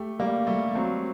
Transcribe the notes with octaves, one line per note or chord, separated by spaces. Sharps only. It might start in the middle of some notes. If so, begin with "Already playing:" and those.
Already playing: A3 G4
G3 A#3
G3 A3
F#3 C4